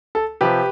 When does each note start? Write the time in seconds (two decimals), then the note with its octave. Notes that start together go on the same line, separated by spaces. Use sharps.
0.15 A4
0.41 C3 F3 G4 B4